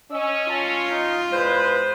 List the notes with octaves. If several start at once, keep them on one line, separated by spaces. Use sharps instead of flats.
C#4 D#5 E6
F4 A5
D#4
E2 G#3 B4 C5